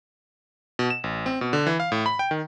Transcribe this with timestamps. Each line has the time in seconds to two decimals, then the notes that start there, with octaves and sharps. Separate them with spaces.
0.79 B2
0.90 E7
1.04 A1
1.26 C4
1.41 B2
1.53 D3
1.67 E3
1.80 F5
1.92 A2
2.06 B5
2.19 G5
2.31 D#3